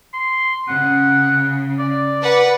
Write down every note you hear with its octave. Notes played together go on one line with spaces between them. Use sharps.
C6
C#3 F#5
D5
B4 F#5